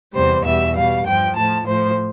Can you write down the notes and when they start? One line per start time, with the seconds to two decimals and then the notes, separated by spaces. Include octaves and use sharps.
0.14 E2 C3 G3 C5
0.45 E2 B2 G3 E5
0.76 B2 G3 F5
1.06 G2 F3 G5
1.37 A2 F3 A5
1.67 A2 F3 C5